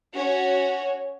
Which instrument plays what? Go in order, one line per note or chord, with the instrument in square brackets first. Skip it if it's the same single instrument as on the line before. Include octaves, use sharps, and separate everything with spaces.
[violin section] C#4 F#4 C#5